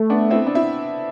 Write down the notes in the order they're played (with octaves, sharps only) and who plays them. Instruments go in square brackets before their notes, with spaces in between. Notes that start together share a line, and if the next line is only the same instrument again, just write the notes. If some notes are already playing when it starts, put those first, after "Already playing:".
Already playing: [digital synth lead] A3
[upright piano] B3 D4
C4 E4
D4
E4